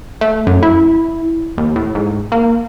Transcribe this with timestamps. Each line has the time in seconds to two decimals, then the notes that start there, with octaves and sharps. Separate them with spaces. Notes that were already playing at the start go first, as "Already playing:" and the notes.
0.21 A3
0.47 F#2
0.63 E4
1.58 D#2
1.76 A2
1.95 G#2
2.32 A#3